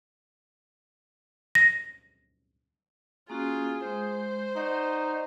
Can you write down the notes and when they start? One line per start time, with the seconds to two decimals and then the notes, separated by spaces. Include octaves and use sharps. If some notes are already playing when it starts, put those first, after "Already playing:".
1.55 A#6
3.30 A#3 C#4 F4 F#4 G#4
3.85 G#3 C5
4.56 D#4 D5 F#5 C#6